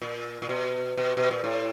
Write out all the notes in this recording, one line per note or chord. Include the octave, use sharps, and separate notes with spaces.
A#2
A#2
B2
B2
B2
A#2
A2